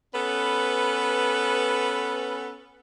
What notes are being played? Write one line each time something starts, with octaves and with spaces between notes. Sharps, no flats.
B3 C#4 A4 B4